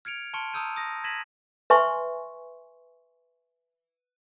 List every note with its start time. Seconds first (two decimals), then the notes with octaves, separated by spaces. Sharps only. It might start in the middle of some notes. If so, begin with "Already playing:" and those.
0.05 F6 G#6 C#7 D7 F7
0.34 A5 C6 C#6 F6 C#7 D7
0.53 A5 A#5 D#6 E6 G6 D#7
0.76 D#6 A#6
1.04 G#6 A#6 B6 D#7 E7 F#7
1.70 B4 E5 G#5 C6 C#6